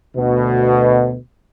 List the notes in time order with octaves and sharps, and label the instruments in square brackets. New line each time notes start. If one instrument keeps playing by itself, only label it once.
[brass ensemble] D2 B2